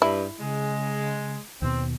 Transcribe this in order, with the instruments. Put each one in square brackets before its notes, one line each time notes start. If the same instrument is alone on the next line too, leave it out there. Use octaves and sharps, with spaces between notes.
[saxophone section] G2 [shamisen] E4
[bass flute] C#3 [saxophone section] G#3
[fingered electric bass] D#2 B2 [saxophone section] C4